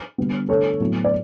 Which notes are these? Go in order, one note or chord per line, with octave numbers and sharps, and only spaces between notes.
D3 G3 B3
D3 A3 A4 C#5
A2 F#3 B3
D5